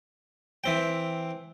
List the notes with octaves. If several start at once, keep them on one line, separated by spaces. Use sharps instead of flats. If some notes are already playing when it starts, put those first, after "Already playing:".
E3 C4 G5